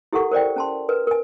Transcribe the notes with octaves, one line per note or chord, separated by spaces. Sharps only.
E4 G4 A4 A#4 F#5 C#6
A#4 C5 D5 G5
C#4 A5 C6
A#4 B4
A#4 G#5